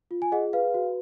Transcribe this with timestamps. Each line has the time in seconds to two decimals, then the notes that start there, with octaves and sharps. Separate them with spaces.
0.11 F4
0.22 G#5
0.32 G#4 D#5 F#5
0.53 B4 F5
0.74 F#4